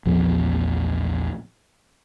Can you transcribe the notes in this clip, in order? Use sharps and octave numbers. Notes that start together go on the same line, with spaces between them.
A#1 E2 F3 B3